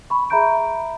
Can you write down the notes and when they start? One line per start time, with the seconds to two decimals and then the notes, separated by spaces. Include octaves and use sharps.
0.10 B5 C#6
0.30 G#4 E5 A#5 B5 G6 D7